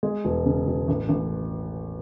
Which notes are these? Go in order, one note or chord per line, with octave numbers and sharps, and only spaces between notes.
G#3
E1
C#3
E1
A1
A1